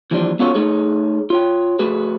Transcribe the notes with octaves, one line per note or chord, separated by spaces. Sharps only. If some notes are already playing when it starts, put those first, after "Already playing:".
D#2 E3 F3 G3 D4
B3 C#4 F4 F#4 A4 C#5
A3 D#4 G#4 C#5
F4 C#5 G5
A3 F#4 G#4 B4